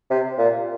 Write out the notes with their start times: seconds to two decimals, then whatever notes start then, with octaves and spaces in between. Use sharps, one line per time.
0.10 C3
0.38 A#2